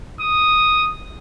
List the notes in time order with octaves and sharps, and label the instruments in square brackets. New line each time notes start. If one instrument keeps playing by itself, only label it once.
[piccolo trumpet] D#6